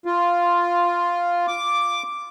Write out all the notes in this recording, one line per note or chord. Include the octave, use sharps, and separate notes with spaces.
F4
D6